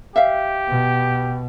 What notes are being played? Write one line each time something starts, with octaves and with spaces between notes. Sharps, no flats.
G4 E5 F5
B2